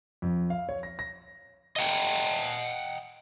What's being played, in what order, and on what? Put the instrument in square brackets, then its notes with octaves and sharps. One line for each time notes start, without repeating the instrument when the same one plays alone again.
[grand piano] F2
F5
C#5
A#6
A#6
[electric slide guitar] D#5 F#5 G5